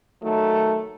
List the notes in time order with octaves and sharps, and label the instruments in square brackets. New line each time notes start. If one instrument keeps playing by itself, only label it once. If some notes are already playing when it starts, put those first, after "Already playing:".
[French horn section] D#3 F#3 A3